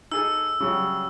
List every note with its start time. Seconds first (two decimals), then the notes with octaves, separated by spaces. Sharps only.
0.12 D#4 G#4 A4 E6
0.60 C#3 F#3 G3